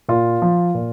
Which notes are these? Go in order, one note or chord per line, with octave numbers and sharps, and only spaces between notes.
A#2 F4
F3
A#2